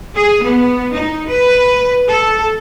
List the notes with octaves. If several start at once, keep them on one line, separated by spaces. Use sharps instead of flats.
G#4
B3
D#4
B4
A4